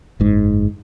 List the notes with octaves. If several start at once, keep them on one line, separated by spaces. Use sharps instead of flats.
F#1 G#2